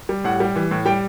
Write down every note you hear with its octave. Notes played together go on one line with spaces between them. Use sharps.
G3
A2 F#5
G3
E3
A2
G3 G5